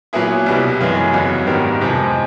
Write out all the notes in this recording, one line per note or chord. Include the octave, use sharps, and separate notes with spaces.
A#2 F#3 B3 E4 G#4
C2 B2 G3 B3
F#2 C#3 E3 G#3
E2 C#3 F#3
G#2 D#3 G3 B3
F2 C3 F3 G#3